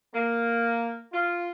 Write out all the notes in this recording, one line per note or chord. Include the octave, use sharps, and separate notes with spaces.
A#3
F4